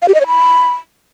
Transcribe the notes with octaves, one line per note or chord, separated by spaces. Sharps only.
F5
G4
D#5
C#5
B5